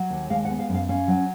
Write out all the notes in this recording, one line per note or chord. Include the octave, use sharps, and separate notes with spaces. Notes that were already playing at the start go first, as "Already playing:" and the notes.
Already playing: F#3
D#2
G#3 F5
F#5
B3
F5
F#2
F5
C#4 F5
F#3